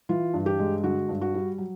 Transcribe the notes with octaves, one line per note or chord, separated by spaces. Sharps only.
E3 F4
G2
G4
G#3
D3 F#4
G2
F#4
G3
F#3